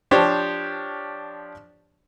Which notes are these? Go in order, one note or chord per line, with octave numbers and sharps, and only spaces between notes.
F3 D4 G4 C5 C#5